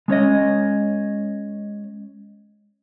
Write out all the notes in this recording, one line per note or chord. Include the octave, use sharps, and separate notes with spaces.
G#3 C#4 C#5 D#5